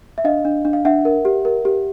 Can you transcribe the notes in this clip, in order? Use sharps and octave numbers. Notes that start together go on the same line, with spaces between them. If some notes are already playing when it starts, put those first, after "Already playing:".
E5
D4 D#5 F5
D4
D4
F5
D4 E5 F#5
A#4
G4
A#4
G4